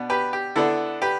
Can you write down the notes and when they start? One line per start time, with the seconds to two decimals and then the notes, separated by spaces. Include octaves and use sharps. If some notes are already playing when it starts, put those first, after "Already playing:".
Already playing: B2 B3 D4
0.10 G4 B4
0.33 G4
0.56 D3 B3 D4 E4 A4
1.02 G4 B4